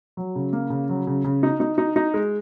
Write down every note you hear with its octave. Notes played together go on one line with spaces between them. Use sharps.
F#3
C#3
A#3
C#3
F#3
C#3
C#3
D#4
D#4
D#4
D#4
G#3